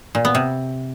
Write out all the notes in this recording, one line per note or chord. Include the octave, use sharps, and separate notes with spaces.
A#2
B3
C3